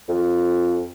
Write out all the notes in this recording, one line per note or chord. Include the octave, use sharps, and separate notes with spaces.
F2